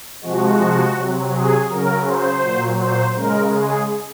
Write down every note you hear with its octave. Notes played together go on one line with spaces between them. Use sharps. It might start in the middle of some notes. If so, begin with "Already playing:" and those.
C3 F3 G#3 F#4
C3 F#3
G#4
C#3 F#3 A#4
C5
A#2 F#3
C5
C#3 G#3 A#4
G#4